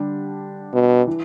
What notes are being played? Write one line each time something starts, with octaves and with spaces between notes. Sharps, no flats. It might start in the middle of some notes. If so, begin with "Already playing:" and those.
Already playing: D3 G3 D4 G4
B2
E3